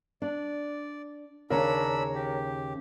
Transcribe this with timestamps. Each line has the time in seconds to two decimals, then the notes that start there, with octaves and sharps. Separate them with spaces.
0.22 D4 D5
1.50 D#2 C#3 D4 A#4 C#5 A#5 B5 E6
2.14 G4